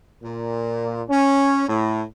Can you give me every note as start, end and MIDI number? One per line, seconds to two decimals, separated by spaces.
0.23 1.03 46
1.10 1.69 61
1.69 2.03 45